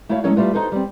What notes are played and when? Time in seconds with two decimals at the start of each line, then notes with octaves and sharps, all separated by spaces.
0.09 A3 E4 F#4 C#5 F5
0.24 F#3 G#3 A3 C#4 A4 C#5
0.36 G3 A3 F4 B4
0.53 D#4 F#4 A4 B4 C5
0.72 G3 C4